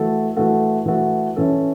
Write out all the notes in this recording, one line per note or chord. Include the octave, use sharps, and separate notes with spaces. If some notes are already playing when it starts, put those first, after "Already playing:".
Already playing: E3 A3 F#4 A4
E3 A3 F#4 A4
E3 A3 F#4 A4
E3 C#4 A4